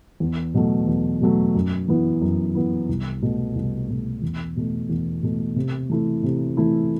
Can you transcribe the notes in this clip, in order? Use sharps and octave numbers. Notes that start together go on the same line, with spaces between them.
E2
B2 F#3 A3
E2
B2 F#3 A3
F#2
E3 B3 E4
F#2
E3 B3 E4
C2
B2 A3
C2
B2 A3
E2
B2 A3
E2
B2 A3
C3
E3 A3 E4
C3
E3 A3 E4